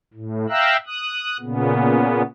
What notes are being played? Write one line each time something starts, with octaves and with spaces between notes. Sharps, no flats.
A2
E5 F5 G5 A#5 E6 F#6
D#6 F#6
A#2 C#3 B3